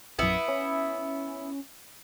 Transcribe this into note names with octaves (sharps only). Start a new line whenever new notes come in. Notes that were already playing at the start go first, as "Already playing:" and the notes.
A#1 F#2 B3 E4
C#4